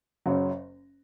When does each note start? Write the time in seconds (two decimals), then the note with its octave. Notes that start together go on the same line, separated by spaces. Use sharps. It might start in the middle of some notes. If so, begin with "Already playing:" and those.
0.26 F#1 F#2 C#3 F#3